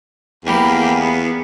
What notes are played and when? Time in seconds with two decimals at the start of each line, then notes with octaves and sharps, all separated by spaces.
0.45 E2 A#3 G4 B5
0.98 B3